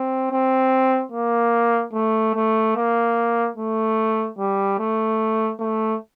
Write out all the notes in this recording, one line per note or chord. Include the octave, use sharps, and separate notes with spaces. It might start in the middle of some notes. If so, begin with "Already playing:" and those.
Already playing: C4
C4
A#3
A3
A3
A#3
A3
G3
A3
A3